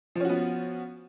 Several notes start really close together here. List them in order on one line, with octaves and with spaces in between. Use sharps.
F3 C#4 F#4 B3